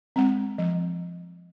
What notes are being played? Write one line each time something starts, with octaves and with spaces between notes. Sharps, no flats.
G#3 C4
F3